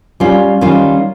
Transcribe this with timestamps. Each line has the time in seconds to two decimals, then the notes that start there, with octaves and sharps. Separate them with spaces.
0.20 G3 C#4 F4
0.61 D#3 G3 C#4 F4